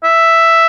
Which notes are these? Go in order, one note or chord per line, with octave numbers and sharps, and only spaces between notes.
E5